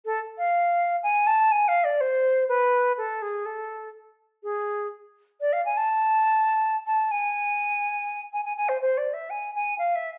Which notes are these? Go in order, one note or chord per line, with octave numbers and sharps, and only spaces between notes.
A4
F5
G#5
A5
G#5
F5
D5
C5
B4
A4
G#4
A4
G#4
D5
F5
G#5
A5
A5
G#5
G#5
G#5
G#5
C5
C5
D5
E5
G#5
G#5
F5
E5